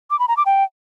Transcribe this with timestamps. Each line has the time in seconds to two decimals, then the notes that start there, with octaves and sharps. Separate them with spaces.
0.11 D6
0.19 B5
0.28 A#5
0.37 D6
0.46 G5